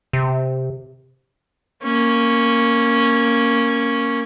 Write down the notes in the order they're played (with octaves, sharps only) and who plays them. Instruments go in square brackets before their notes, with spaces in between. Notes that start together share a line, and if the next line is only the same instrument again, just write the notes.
[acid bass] C3
[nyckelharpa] A#3 C#4